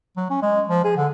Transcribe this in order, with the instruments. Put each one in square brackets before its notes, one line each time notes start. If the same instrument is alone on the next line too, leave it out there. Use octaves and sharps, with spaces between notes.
[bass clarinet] F#3
C#4
G#3
F3
G#4
D3